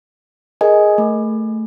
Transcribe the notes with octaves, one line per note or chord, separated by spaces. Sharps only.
G#4 A#4 D#5 G#5
A3